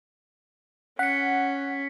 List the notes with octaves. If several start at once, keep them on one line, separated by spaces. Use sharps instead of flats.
C#4 F#5 B6 C#7